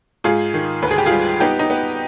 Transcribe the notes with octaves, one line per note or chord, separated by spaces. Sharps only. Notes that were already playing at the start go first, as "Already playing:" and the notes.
G#2 F4 G#4
D#3
D2 B4
G#4
G4
G3 F4 G#4
B3 D#4 G4
D#4
B3